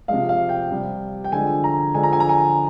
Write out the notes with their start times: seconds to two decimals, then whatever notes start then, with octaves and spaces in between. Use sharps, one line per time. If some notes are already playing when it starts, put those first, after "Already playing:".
0.08 C3 F3 G#3 F5
0.29 F5
0.49 G5
0.71 C3 G3
1.24 G5
1.32 D3 F3 G#3 G#5
1.64 A#5
1.95 D3 F3 G#3 G#5
2.03 A#5
2.13 G#5
2.20 A#5
2.29 G#5